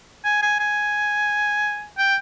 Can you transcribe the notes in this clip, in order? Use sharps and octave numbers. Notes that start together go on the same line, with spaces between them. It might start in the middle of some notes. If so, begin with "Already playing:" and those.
G#5
G#5
G#5
G5